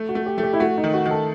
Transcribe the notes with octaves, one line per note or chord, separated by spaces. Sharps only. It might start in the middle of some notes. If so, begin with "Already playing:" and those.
Already playing: A3
F#4
A3
G4
A3
G4
E4
A3 F#4
D#4
D#3
F#4
D#3
A4